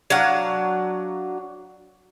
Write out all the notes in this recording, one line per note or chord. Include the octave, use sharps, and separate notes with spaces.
F#3 D4 F5 F#5